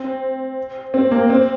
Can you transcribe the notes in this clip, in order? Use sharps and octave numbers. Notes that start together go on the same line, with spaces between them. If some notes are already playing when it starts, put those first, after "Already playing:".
Already playing: C4
C4
A#3
C4